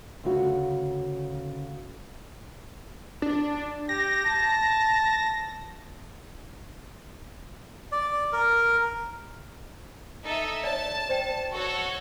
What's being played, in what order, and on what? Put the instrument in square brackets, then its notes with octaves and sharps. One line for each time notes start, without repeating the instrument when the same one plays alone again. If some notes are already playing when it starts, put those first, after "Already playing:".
[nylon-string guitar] D2 C#3 F#4
[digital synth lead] D4
[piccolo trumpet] G4 [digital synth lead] A#6
[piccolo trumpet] A5
[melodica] D5
A#4
[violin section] D#4 A4 E5
[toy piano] C#5 D5 [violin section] A5
[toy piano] C5 D5 G5
[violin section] F#4 A4 C#5